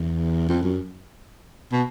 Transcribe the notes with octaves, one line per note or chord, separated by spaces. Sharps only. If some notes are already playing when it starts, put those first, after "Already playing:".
Already playing: E2
F2
F#2
B2